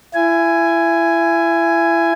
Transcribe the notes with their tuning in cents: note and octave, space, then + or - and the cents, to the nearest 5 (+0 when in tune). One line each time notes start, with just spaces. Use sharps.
E4 +30 G#5 +0